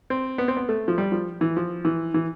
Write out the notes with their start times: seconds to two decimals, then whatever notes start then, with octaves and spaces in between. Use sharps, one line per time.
0.10 C4
0.38 B3
0.48 C4
0.57 B3
0.69 A3
0.88 F3
0.98 G3
1.12 F3
1.41 E3
1.57 F3
1.85 E3
2.14 E3